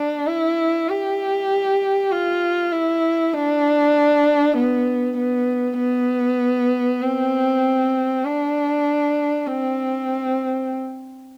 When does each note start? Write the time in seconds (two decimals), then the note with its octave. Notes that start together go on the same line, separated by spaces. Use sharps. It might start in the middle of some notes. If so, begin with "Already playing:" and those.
Already playing: D4
0.27 E4
0.89 G4
2.12 F4
2.72 E4
3.34 D4
4.57 B3
5.18 B3
5.79 B3
7.02 C4
8.24 D4
9.47 C4